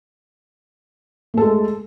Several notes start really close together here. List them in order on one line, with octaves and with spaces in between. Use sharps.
A3 A4 G#3